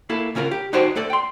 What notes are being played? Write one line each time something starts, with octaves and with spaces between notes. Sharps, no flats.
A#3 E4 A4
C#3 C#4 F4 A#4
G4
D#4 F#4 C5 D5 G5 A5
A3 A4 D5
G5 C6